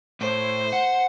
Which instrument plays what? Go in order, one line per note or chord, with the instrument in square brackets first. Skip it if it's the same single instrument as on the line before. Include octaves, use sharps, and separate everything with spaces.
[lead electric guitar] A2 [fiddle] C5
[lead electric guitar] F#5